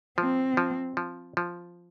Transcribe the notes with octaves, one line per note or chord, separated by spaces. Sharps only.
F3 C4
F3
F3
F3